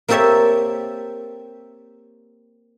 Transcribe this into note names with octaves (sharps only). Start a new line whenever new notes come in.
A#3 C4 G4 A4 C#5 E5